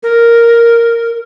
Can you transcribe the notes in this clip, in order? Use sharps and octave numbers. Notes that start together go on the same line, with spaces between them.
A#4